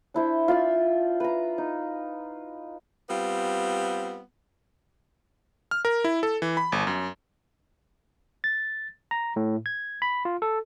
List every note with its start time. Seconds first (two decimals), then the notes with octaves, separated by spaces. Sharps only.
0.14 D4 E4 C5
0.48 F4 D5 E5
1.20 B4 A#5
1.58 D#4
3.09 G3 B3 C4 F4
5.71 F6
5.85 A#4
6.04 E4
6.23 A4
6.42 E3
6.57 B5
6.72 G1
6.87 F#2
8.44 A6
9.11 A#5
9.36 A2
9.66 G#6
10.02 B5
10.25 F4
10.42 A4